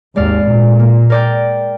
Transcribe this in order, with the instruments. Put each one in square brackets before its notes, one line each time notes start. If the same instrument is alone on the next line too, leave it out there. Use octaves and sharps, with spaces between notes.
[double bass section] G#1 D#2 [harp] G#3 D5 F5
[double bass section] A#2
[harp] A#3
A#4 D5 G5